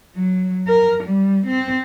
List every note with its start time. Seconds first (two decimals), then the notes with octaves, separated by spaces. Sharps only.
0.16 F#3
0.67 A#4
1.04 G3
1.47 C4